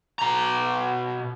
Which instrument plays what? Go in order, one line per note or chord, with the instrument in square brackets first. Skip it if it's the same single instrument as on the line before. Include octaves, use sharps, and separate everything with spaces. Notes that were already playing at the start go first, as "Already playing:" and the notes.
[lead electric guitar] B2 A#5